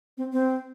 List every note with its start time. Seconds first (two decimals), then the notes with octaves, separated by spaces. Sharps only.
0.18 C4
0.33 C4